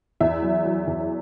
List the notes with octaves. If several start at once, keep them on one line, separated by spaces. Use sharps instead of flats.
E2 E5
F#3
F#3
E2